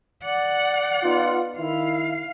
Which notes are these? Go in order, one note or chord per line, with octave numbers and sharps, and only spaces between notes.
D5 F#5
B3 D#4 F4
D#3 E4 F5